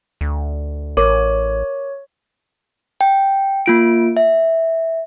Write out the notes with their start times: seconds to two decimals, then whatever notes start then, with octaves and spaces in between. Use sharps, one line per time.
0.21 D2
0.97 A1 A#4 C#5 D6
3.01 G5
3.66 A#3 F4 D7
4.17 E5